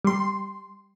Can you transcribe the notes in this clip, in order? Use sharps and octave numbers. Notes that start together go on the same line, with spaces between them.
G3 C6